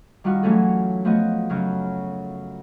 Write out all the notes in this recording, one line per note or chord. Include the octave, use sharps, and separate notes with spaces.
D#3 G3 D#4 F4 F#4
E3 F#3 A3 C#4 G#4 A4
F3 A3 B3 F#4 D#5
F#2 C#3 C#4 F#4